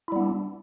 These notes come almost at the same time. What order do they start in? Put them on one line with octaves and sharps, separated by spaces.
E4 G3 B3 D4